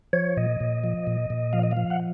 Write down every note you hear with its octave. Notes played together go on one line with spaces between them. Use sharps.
F3 C#5
A#2 D#5
A#2
F3
A#2
A#2
F3 F5
D#5
F5
F3
F#5